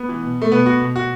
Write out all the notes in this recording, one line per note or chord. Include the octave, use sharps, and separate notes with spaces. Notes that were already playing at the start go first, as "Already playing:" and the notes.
Already playing: B3
E3
B2
A3
B2 B3
F#4
B2
F#4